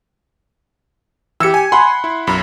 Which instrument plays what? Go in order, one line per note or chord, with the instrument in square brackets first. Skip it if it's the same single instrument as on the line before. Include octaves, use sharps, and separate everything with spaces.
[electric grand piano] E3 C#7 [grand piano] G4 E6
[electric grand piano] G#5
[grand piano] F#5 B5 C6
[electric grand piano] E4
B1 F#2 B5